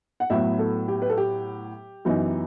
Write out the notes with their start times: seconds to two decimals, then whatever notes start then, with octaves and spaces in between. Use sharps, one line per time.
0.20 F#5
0.30 A2 F#3 B3 E5
0.59 A4
0.88 G4
1.02 B4
1.10 A4
1.17 G4
2.05 F#2 E3 B3 D#4